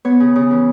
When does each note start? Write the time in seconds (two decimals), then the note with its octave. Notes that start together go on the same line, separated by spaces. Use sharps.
0.05 B3 C#5
0.20 C#3
0.36 C#3
0.51 E3